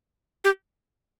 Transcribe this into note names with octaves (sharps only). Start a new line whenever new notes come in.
G4